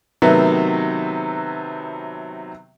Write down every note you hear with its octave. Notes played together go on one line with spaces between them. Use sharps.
C3 D#3 F#3 A3 B3